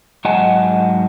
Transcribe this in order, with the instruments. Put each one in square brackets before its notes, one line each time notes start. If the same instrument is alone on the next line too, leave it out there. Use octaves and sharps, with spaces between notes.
[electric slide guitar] G#2 F#3 D#5 F#5 G#5 A5